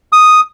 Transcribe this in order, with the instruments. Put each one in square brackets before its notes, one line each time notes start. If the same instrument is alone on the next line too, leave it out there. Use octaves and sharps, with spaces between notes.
[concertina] D#6